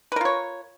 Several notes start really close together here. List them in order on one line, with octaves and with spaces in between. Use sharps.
B4 A#4 F4 C#5